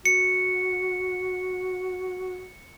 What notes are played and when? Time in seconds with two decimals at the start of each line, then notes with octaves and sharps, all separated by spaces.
0.05 F#4 C#7